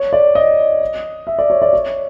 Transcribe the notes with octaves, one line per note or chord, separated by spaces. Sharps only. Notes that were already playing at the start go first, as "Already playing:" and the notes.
Already playing: C#5
D5
D#5
E5
D5
C#5
D5
C#5